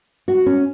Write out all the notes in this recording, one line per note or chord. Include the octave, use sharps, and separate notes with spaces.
F#4
C#4